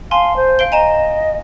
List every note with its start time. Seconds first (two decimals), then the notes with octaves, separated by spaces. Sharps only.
0.11 F5 G#5 A5 C6
0.36 C5
0.59 F5 D7 G7
0.72 D#5 G#5 A#5 E7